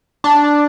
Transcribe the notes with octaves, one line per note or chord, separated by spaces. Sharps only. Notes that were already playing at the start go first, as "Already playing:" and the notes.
D4